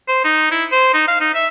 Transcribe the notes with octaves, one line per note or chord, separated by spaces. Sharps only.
C5
D#4
E4
C5
D#4
F5
D#4
E5